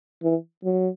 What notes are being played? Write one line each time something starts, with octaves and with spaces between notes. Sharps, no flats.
E3
F#3